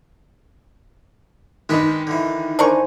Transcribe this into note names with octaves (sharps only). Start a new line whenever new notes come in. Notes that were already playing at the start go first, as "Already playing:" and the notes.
D#3 G#3 D4 D#4 B4
D3 E3
D4 A#4 C5 G#5 C#6